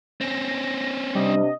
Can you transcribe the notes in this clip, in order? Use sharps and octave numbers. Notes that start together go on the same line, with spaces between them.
C4 C#4 A#6
C3 G3 D4 D#5